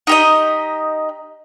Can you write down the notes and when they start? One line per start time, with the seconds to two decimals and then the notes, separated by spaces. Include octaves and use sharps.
0.07 D#4 G4 D#5